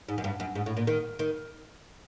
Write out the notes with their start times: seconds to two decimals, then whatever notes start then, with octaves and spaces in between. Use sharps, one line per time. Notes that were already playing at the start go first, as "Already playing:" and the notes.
0.09 G#2
0.18 F#2
0.24 G2
0.40 F#2
0.55 G#2
0.66 A2
0.77 A#2
0.87 D#3
1.19 D#3